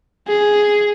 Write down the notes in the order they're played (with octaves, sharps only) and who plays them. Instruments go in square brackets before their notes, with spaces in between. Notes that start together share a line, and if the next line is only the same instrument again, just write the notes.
[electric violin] G#4